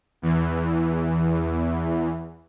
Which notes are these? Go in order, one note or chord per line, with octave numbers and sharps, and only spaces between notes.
E2 E3